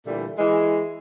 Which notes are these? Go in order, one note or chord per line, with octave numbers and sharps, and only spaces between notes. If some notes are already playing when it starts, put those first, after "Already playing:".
A#2 D3 E3 G3 A3
E3 G#3